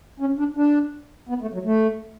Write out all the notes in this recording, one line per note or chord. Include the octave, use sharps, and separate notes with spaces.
C#4
D4
D4
B3
A3
F#3
A3